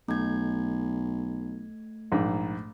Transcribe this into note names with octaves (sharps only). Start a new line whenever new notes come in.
B1 A3 G#6
A#1 G#2